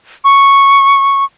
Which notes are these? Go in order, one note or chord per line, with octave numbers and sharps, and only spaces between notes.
C#6